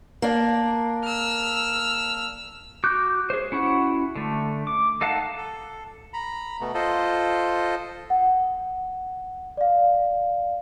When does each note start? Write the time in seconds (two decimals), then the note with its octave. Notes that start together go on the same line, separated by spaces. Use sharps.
0.22 A#3 D4
1.04 E6 F6
2.84 F#4 D6 F#6 G6
3.30 G#4 C5
3.52 C#4 E4 F#4 F#5
4.16 D3 A3
4.67 D6
5.01 D#4 A4 F5 F#5 A5
5.37 A4
6.13 A#5 B5
6.61 B2 A3 B3
6.74 F4 A4 C5 D#5
8.10 F#5
9.57 D5 F5